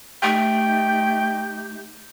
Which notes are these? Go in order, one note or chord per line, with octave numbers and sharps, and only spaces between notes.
A3 D#4 G4 G5 G6